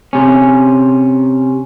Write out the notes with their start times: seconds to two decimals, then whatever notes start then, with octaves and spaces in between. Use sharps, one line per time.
0.13 C3 C#4